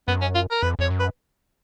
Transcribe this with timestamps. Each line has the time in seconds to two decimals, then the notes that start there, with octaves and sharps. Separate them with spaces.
0.08 F#2 B3
0.21 C#4
0.35 F4
0.51 A#4
0.63 F2 B4
0.79 F2 C#5
0.90 F#2
1.00 B4